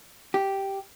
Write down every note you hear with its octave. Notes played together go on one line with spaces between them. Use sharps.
G4